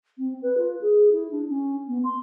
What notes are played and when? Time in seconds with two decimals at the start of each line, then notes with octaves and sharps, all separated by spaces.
0.18 C4
0.42 B4
0.57 F4
0.81 G#4
1.12 E4
1.31 D4
1.49 C#4
1.88 B3
2.04 C6